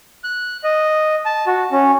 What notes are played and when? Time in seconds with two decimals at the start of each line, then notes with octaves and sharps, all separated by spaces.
0.24 F#6
0.64 D#5
1.26 A5
1.47 F#4
1.72 C#4